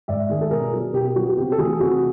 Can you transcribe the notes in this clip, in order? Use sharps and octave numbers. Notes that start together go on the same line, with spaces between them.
G#2 D5 E5
D#3 G#3 G#4
A4
B2 G#4 A#4
F#3 B3
B2 G4
G4
F#3 B3 F#4
F#4
C3 G4
A4
E3 A3 F#4 G#4
C3 F#4 G#4